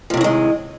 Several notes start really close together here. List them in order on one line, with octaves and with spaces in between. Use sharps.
F3 C3 A2 D#3 G#3